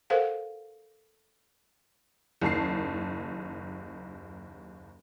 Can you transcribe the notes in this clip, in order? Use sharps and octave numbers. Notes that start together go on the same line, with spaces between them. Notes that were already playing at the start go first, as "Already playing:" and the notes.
A4 A#4 C5 F5 F#5
F#1 D#2 A5 C7